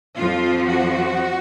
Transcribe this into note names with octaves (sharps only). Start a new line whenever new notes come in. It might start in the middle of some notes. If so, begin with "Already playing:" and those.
F2 F3 F4
F#4